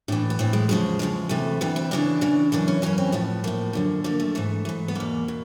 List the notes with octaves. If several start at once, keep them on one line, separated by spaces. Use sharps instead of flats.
A2 E3 D4
B3
A2 E3 C4
G#3
E2 C#3 F3 G#3
E2 C#3 F3 G#3
D2 C3 E3 A3
D2 C3 E3 B3
C4
E2 C#3 E3 D4
E2 C#3 E3
F#2 C#3 E3 D4
C#4
F#2 C#3 E3 C#4
C4
A2 F3 B3
A2 F3 A#3
F#2 D3 F3
F#2 D3 F3 A#3
A3
G#2 E3 A3
G#2 E3
B3
E2 B2 A#3
B2